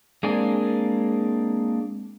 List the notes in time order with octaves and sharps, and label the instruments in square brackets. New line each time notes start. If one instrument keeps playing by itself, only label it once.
[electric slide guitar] G#3 A#3 C4 D4 G#5